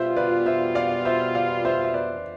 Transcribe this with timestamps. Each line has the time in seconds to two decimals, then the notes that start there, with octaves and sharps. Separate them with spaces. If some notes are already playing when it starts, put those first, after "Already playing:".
Already playing: B2 G3 B3 F4 C5 E5
0.16 B4 D5
0.46 C5 E5
0.75 D5 F5
1.05 C5 E5
1.35 D5 F5
1.65 C5 E5
1.85 E5
1.94 B4 D5